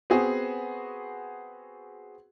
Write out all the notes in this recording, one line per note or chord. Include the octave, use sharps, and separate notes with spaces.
B3 C4 F#4 G#4